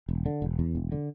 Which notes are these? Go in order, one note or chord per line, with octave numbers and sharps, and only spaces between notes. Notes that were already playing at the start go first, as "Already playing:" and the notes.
E1
D3
E1
E2
E1
D3